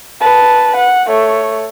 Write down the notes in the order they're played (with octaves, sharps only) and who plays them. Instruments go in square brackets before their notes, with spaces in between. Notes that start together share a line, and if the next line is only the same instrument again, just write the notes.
[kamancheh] B4 A5
F#5
A3 C#5